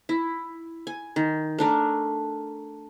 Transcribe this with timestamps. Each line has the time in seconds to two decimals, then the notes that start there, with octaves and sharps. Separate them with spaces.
0.09 E4
0.87 G#5
1.16 D#3
1.58 A3 D4 A#4